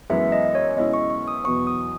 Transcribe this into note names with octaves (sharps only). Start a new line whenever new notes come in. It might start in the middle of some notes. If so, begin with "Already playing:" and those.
F#2 E3 G#3 B3 E5
D#5
C#5
B2 G#3 C#4 E4 D#5
C#6
C#6
D#6
E2 B2 F#3 B3 C#6
D#6